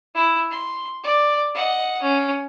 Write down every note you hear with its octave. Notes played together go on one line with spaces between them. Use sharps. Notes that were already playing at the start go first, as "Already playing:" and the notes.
E4
C6
D5
D#5 F#5
C#4